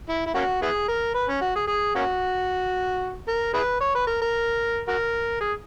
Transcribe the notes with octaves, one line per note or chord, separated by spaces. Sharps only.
E4
E4
A#3 C#4 F#4
B3 E4 G#4
A#4
B4
C#4
F#4
G#4
G#4
A#3 C#4 F#4
A#4
E4 G#4 B4
C#5
B4
A#4
A#4
F#4 A#4
G#4